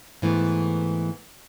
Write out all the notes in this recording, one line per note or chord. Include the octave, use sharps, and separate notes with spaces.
G#2 E3 A3 B3